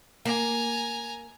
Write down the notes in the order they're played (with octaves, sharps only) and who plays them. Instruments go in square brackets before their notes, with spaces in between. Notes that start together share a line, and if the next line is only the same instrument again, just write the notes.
[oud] A#3 [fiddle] G#5 A#5